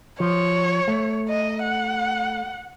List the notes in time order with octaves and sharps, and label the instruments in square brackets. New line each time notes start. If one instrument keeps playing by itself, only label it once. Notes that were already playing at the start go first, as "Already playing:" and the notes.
[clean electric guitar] F3 [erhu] C#5
[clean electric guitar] A3
[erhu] D#5
F#5